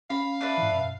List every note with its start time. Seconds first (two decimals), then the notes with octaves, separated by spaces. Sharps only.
0.10 C#4 F5 B5
0.41 D4 B4 E5
0.58 G#2 E3
0.72 F#2 B2